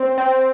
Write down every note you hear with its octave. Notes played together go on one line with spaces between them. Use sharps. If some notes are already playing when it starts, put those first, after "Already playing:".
Already playing: C4
C4